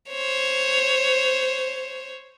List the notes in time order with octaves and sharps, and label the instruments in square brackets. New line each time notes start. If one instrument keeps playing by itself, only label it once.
[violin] C5 C#5